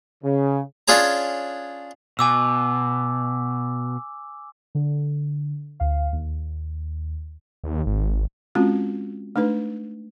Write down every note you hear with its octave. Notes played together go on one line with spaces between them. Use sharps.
C#3
C#4 D4 F4 G#4 C#5 A#5
B2 G#5 D6 E6
D3
D2 F5
D#2
D#2
G#1
G#3 C4 C#4 F4 F#4
A3 D4 D#4 B4